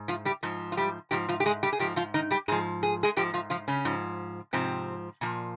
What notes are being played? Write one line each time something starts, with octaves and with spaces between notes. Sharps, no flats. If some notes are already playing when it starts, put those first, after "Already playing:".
Already playing: G#2
F3 F4
G3 G4
G#2 F3
F4
G3 G4
G#2 F3 G4
F3 F4
G4
G#3 G#4
G3 G4
G#4
G#2 F3 G4
F3 F4
D#3 D#4
G3 G4
G#2 F3 G#3 G#4
G#4
G#3 G#4
G#2 F3 G4
F3 F4
F3 F4
C#3 C#4
G#2 F3
G#2 C3 F3 C4
A#2 F3